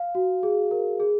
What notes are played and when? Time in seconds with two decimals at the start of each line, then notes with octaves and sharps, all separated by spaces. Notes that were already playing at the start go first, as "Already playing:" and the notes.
Already playing: F5
0.15 F#4
0.43 G#4
0.71 A#4
1.00 G#4